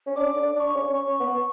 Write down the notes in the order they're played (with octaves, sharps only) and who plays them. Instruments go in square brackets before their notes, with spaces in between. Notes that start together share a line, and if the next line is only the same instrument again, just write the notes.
[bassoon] C#4
[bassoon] D4 [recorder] D6
[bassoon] D4
[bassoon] D4 [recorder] D6
[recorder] C#6
[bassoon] C#4
[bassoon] C#4 [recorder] C#6
[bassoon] B3